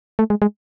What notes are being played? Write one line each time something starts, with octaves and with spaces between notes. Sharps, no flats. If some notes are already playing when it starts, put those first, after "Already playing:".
A3
G#3
G#3